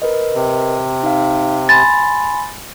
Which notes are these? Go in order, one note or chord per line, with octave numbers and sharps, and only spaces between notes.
A#4 B4 D#5
C3
D#4 F5
G#5 B5 C6 A6